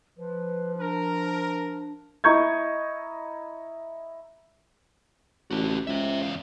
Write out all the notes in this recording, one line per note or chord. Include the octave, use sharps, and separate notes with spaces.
F3 B4
D4 A#4
E4 D#5 A#5 C#6 G6 G#6
A1 F#4 A4
C#2 C5 E5
E2 F5